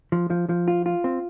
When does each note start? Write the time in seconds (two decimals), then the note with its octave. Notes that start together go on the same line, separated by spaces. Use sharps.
0.12 F3
0.30 F3
0.49 F3
0.68 F4
0.86 F4
1.04 C4